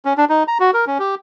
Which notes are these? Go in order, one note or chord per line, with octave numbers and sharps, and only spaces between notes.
C#4
D4
D#4
A#5
F#4
A#4
C#4
G4